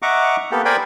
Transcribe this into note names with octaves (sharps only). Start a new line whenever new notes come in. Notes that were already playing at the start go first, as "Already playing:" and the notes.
D#5 E5 F#5 A#5 C#6 D6
A#3 B3 G4 A4
A#4 C5 D5 G5 G#5 B5